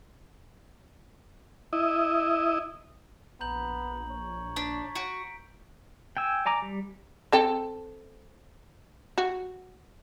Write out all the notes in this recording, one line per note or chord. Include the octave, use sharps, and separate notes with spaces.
E4 D#5
A#1 B3 A#5 G6 F#7
C#5
D4 B6
F#4 B6 D7
G5 G#5 E6
D5 G#5 A#5 D6
G3
C4 A4 G5
F#4